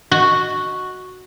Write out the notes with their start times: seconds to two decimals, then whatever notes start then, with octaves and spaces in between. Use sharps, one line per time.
0.11 F#4